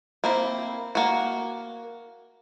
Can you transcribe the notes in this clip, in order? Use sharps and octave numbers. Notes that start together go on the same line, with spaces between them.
A#3 C4 E4
A#3 F#4